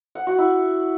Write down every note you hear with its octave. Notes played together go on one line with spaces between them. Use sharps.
F#5
F#4
E4